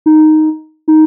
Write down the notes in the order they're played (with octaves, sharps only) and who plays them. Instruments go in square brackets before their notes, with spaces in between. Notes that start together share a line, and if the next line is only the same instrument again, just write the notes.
[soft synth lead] D#4
D#4